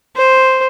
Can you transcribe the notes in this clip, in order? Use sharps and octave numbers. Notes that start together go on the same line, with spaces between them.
C5